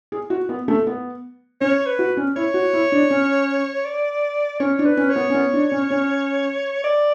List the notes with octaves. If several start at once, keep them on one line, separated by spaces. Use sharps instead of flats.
G#4
F#4
B3
A3
B3
C#4 C#5
B4
F#4
C#4
E4 C#5
F#4
E4
D4
C#4
D5
C#4 C#5
D4
B4
C#4
C#5
B3
C#4
B3
D4
C#4
C#4
D5